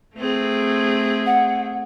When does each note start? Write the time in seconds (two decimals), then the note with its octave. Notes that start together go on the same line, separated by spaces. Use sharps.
0.16 A3 C4 G#4
1.26 F#5